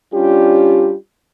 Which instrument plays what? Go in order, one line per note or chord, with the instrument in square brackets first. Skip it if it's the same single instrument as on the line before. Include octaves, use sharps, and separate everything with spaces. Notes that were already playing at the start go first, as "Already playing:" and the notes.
[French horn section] G3 C#4 D4 F4 G4